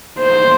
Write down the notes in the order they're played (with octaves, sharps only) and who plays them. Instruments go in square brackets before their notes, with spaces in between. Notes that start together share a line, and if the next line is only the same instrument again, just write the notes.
[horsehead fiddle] C5